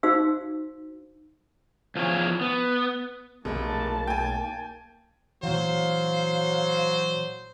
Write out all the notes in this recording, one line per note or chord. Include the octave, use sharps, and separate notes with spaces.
D#4 F#4 C5 F5 E6
E2 F3 F4 G#4 C#5
B3
F1 B1 A3 A#3 G#4 A4 A5
G5 G#5
A#2 E3 F#3 C5 F5